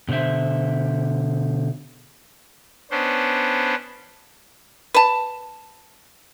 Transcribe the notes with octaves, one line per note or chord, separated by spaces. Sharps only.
B2 D3 B3 C5 E5
B3 C#4 D4 C5
B4 A5